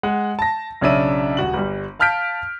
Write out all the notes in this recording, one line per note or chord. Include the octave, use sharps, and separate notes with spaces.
G#3 F#5
A5 A#6
B1 C#3 C#4 D4 E5 D#7
D#1 F#4 F#7
G1 G3
F5 A5 F6 G6 B6 D7